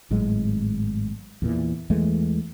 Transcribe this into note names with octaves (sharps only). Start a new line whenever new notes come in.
G#1 A2 F#3 G#3
E2 A#2 E3
E2 E3 G#3 A3